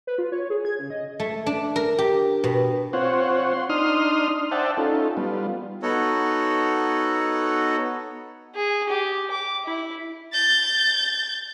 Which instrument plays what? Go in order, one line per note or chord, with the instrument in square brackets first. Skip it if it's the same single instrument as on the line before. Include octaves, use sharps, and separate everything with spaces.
[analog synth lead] B4
F4
C#5
G#4
G#6
C#3
D#5
[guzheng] A3
D4
A#4
G4
B2
[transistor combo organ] C4 F4 C5 C#5 F#5
C6
D4 D#4 C6 D#6 F6
C5 D5 E5 F#5 G5 A5
C#4 D#4 F4 A4
G3 B3 F4
[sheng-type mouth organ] B3 D#4 F#4 A4 C#5
[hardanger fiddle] G#4
G4
D6
E4
[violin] G6 A6